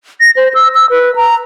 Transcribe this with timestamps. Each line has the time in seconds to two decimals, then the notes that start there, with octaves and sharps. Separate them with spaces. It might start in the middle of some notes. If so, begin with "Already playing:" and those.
0.20 A#6
0.37 C5
0.55 E6
0.75 E6
0.90 B4
1.16 A#5